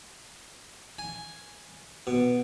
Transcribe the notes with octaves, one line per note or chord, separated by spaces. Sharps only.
G#5
B2